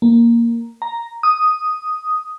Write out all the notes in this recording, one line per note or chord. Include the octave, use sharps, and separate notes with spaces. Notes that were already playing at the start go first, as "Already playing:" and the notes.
A#3
A#5
D#6